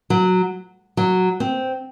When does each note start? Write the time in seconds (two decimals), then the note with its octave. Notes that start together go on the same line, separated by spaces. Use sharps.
0.10 F#3
0.97 F#3
1.40 C4